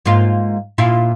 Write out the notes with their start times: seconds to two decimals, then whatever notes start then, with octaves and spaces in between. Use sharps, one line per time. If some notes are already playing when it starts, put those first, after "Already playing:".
0.06 G#2 A#3 F4
0.78 A#2 E4 F4